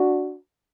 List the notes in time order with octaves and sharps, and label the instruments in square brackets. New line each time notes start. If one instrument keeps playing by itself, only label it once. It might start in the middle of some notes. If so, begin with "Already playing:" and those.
Already playing: [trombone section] D4 F#4